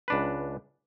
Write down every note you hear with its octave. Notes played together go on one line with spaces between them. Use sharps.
C#2 D4 B4